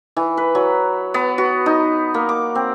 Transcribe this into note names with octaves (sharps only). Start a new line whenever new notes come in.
E3
B4
F#3
B3
F#4
D#4
A#3
D6
C4